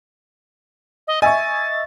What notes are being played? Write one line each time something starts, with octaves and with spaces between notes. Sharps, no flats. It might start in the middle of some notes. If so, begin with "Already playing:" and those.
D#5
D#5 E5 G#5 C#6 A6